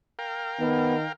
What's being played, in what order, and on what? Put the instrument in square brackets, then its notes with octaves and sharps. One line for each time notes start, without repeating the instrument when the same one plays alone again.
[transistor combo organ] A#4 F5 G5
[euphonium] D#3 [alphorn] B3